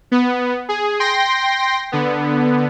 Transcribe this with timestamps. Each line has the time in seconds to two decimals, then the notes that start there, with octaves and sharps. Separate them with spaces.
0.12 B3
0.69 G#4
1.00 G5 C6 A#6
1.92 D3 B3